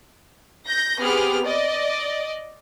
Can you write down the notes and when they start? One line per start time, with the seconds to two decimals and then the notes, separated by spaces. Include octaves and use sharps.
0.68 G6 A#6
1.00 B3 C4 G4 G#4 F6
1.44 D5 D#5